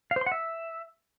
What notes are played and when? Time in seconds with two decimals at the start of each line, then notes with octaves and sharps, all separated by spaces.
0.11 F5
0.16 C5
0.21 C6
0.26 F#5
0.32 E5